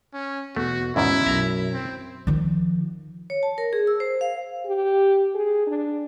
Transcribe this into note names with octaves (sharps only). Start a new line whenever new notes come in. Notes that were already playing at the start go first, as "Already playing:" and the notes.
C#4
E2 B2 A3 F#4
E2 G#2 B2 D#3 C#4 E4
B1 F#2 E5 A#5
C4
D#3 F3
C#5
A5
A#4
G#4
E6
C5
F5
G4
G#4
D4